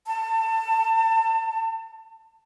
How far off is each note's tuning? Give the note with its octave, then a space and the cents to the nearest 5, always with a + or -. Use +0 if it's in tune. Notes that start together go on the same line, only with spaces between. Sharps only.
A5 +30